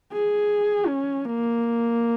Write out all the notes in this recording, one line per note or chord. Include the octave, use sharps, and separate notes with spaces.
G#4
C#4
A#3